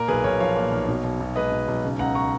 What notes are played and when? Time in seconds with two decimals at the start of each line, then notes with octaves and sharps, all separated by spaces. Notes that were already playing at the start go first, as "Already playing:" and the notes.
Already playing: A#2 A#4
0.08 B1 G#4 B4
0.24 B1 A#4 C#5
0.40 F3 C#5 F5
0.56 A#2
0.72 B1
0.88 B2
1.04 B1
1.20 B1
1.36 G#3 B4 D#5
1.52 B2
1.68 B1
1.84 C#3
1.99 C#2 F#5 A#5
2.15 A#5 C#6